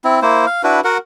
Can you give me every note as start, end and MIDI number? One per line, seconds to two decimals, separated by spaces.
0.04 0.20 60
0.04 0.20 64
0.22 0.45 58
0.22 0.45 64
0.22 0.45 72
0.46 0.62 77
0.63 0.80 62
0.63 0.80 64
0.63 0.80 66
0.63 0.80 71
0.84 0.98 66
0.84 0.98 70
0.84 0.98 78